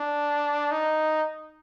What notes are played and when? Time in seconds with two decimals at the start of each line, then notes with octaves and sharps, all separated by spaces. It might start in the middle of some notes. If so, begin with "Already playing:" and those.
Already playing: D4
0.71 D#4